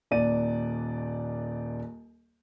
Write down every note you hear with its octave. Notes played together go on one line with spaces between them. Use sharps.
D#1 D#2 D5 D#7